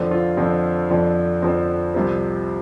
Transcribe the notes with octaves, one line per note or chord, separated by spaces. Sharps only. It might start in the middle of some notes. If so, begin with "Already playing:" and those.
Already playing: F2 D3 F3 C4
F4
F2 D3 F3 C4
F2 D3 F3
F2 D3 F3 C4
C2 C3 F3